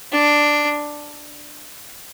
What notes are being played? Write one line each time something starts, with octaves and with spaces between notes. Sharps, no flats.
D4